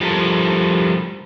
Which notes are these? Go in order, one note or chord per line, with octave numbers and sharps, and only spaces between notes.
F3 G3 A4 A#4